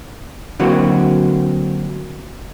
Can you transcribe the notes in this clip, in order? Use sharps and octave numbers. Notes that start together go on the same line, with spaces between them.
D3 F#3 A#3 C4 F#4